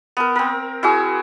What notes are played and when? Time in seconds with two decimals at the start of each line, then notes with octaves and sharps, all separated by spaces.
0.17 B3 A#4
0.36 C4 A#4
0.83 E4 F#4 G#4